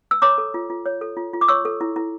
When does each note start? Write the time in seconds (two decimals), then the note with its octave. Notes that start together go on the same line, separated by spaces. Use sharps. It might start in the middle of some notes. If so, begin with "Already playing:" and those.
0.11 E6
0.22 C#5 A#5 D6
0.38 A4
0.54 F4
0.70 F4
0.86 C#5
1.01 A4
1.17 F4
1.34 F4
1.41 D6
1.48 C#5 C#6 E6
1.65 A4
1.81 E4
1.96 E4